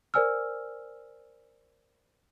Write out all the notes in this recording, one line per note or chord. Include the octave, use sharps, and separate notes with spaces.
A#4 C5 D5 G#5 E6 F6